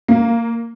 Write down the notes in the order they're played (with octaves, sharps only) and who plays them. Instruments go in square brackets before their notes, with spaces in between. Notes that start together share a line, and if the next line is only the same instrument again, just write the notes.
[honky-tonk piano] A#3